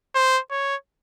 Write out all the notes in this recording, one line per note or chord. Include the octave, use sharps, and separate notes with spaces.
C5
C#5